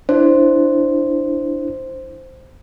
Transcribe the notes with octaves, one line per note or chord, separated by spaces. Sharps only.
D4 E4 C5